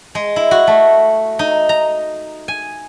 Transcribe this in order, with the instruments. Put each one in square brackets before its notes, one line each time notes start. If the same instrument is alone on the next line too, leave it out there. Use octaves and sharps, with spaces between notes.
[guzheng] G#3
E4
F#4
A3
D#4
A#5
G#5